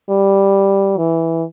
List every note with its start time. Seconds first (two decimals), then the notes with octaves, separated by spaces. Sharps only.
0.09 G3
0.97 E3